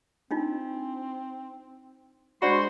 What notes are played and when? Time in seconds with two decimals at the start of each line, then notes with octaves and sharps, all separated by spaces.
0.31 C4 D4 D#4 F4
2.42 G#3 D4 F#4 C5 D5 B5 C6